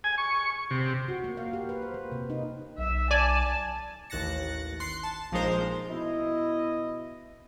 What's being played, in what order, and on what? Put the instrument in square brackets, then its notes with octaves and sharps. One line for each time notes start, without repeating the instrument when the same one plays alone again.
[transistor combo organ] G#5
C#6
C3
[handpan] F#4
A#3
F5
G4
B4
C5
A#3
C3
D#4
[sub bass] B1 [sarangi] E5
[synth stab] D5 G#5 [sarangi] A5
[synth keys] A1 D#2 F#6 A6 A#6 C#7
C6 F#6 C7 C#7
A5
A#1 F3 G#3 D#4 A#4 C5
[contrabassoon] B2 [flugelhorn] E4 [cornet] D#5